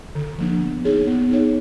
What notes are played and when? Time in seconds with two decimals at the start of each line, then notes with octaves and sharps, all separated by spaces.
0.15 D3
0.38 F3 A#3 D4
0.61 B3
0.84 D#4 G#4 C#5
1.07 B3
1.31 D#4 G#4 C#5